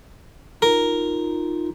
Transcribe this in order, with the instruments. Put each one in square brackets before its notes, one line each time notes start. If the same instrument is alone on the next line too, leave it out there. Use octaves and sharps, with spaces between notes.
[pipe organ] D#4 F4 [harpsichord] A#4